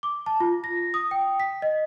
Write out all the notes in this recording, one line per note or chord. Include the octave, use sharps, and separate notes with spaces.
D6
A5
F4
A#6
D#6
G5
B6
D#5